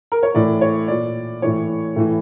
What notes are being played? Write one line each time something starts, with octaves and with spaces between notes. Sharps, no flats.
A#4
C#5
A2 E3 D5
C#5
A#2 D5
A2 E3 C#5
A2 E3